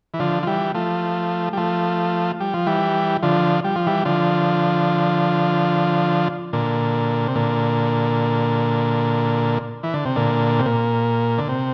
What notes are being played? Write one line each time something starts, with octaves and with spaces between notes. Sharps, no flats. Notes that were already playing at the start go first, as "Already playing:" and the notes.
E3
D3 F3
F3
E3 G3
F3 A3
G3
F3 A3
G3
F3
E3 G3
D3 F3
G3
F3
E3 G3
D3 F3
A#2 D3
C3
A#2 D3
E3
D3
C3
A#2 D3
C3
A#2
D3
C3